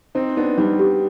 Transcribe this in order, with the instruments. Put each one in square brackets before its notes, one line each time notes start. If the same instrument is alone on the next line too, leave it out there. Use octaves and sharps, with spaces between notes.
[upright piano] C4 D#4 [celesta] C5
[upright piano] B3 D4 [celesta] D#4
[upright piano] G3 B3 [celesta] D#4
[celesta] G4